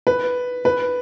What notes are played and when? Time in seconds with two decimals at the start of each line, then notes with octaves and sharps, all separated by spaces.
0.07 B4
0.65 B4